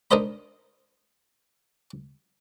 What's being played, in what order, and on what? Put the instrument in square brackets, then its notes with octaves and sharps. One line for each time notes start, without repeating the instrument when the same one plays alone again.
[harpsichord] D4 D#4 A#4 C5 D#5 B5